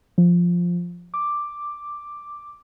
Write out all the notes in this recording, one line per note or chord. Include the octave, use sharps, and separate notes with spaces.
F3
D6